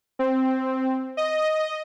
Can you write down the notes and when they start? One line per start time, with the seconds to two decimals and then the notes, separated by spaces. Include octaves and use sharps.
0.19 C4
1.17 D#5